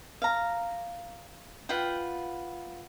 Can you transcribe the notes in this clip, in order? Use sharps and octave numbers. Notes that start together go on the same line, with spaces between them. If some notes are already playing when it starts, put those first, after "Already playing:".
F5 A#5
F4 B4 F#5 G5